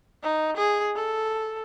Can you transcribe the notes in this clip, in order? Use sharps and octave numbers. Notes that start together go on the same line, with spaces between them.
D#4
G#4
A4